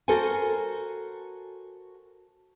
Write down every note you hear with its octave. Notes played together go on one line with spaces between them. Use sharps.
F#4 A4 A#4 C5 G#5